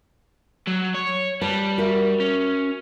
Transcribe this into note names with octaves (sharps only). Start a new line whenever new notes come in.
F#3
C#5
G3 B4 A5
F#4 A#4 E5
C#4